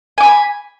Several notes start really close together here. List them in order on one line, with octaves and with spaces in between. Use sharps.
G#5 D6 B5